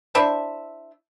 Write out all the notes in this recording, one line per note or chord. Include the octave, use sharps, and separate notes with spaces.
D4 E4 C5 E5